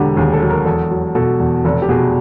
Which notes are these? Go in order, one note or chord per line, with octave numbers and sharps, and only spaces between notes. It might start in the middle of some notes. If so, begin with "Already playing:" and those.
Already playing: E1 D3 F#4 G4
D#2 G#4
A4
F#3
A#4
E2 A4
F#3
B2 A4
E2
F1 A4
G4
B2 G#4